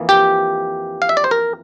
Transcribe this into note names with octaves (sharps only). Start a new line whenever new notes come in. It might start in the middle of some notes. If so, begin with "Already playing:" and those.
Already playing: F2 E3 A#3
G4
F5
E5
D5
C5
A#4